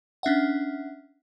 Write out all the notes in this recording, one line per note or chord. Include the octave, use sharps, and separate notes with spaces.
C#4 D4 E5 F#5